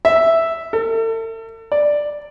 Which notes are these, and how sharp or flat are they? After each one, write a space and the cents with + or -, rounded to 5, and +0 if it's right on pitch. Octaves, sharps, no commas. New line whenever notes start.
E5 +0
A4 +40
D5 +5